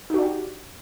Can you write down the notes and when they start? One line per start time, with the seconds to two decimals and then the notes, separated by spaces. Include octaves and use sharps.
0.10 D#4
0.14 F#4
0.18 D4
0.22 G4